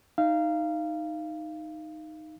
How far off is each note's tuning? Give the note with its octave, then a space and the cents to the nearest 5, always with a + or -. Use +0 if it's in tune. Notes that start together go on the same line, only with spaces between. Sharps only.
D#4 +0 F5 -20